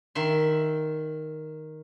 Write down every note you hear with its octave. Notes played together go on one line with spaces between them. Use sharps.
D#3 E5 C6